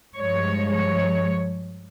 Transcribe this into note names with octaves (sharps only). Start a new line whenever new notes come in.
G2 F3 G#3 C#5
C#5